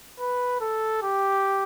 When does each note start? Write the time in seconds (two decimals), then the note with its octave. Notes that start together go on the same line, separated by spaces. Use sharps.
0.20 B4
0.61 A4
1.03 G4